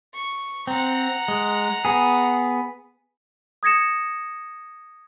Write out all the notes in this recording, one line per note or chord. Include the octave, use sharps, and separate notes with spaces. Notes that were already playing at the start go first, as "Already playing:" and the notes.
C#6
C4 F#5 A#5
G#3
B3 G#4
D#6 G#6 A#6 C#7 E7